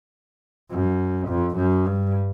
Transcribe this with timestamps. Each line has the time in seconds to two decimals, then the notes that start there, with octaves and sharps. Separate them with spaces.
0.70 F#2
1.28 F2
1.57 F#2
1.86 G2